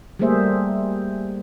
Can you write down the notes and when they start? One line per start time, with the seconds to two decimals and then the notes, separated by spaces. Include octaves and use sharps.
0.19 G3 A3 A#3 G#4 C5 E5